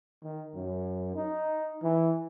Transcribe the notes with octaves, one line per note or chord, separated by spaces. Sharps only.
D#3
F#2
D#4
E3